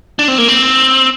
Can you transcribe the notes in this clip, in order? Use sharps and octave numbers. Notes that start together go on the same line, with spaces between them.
D4
C4
A#3
C4